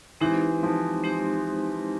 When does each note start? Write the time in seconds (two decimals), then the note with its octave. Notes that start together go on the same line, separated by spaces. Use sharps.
0.21 E3 G#3 C4 D#4 G4 C5
0.63 F3
1.04 G#3 C4 D#4 G4 C5